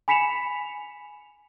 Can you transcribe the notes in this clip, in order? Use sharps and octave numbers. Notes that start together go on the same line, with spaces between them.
G#5 B5 B6 C#7 E7 F7